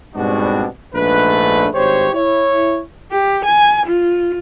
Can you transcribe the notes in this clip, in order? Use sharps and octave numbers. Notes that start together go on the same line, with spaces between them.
G#2 B2 G3 C4 D4 F#4
A#1 G#2 A3 D4 B4
G#1 G2 G4 C5 C#5
E4 C#5
G4
G#5
F4